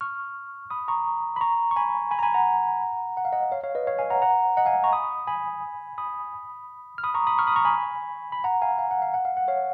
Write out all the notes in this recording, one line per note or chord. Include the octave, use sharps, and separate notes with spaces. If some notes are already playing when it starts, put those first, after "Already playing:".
C#6 F6
B5 D#6
A#5 C#6
B5
A#5 C#6
C#6
G#5 B5
G#5 B5
A#5
G#5 B5
F#5 A#5
F#5
F5
D#5 F#5
C#5 F5
C#5 F5
B4 D#5
C#5 F5
F5 G#5
F#5 A#5
F#5 A#5
D#5 F#5
F5 G#5
A#5 C#6
B5 D#6
G#5 B5
B5 D#6
F6
B5 D#6
A#5 C#6
B5 D#6
C#6 F6
B5 D#6
A#5 C#6
G#5 B5
B5
F#5 A#5
F5 G#5
F5
F#5
F5
F#5
F5
F#5
C#5 F5